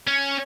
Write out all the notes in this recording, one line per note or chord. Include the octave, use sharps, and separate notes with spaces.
C#4